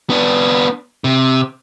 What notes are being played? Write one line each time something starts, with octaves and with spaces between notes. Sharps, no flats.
B3 D4
C3